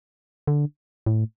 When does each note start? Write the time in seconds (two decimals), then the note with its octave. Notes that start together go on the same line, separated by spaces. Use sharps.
0.47 D3
1.06 A2